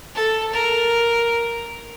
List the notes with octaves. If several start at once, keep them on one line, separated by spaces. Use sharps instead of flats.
A4
A#4